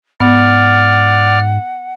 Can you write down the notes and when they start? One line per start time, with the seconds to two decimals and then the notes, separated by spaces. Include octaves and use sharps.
0.20 G#2 B3 D5 F#5 F6